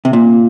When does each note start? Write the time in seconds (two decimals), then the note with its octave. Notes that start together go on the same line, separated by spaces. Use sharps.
0.05 C3
0.13 A#2